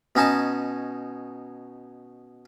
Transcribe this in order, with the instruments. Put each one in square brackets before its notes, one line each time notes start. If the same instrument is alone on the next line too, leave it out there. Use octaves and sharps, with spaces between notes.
[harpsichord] B2 C#4 D#4 G#5 A5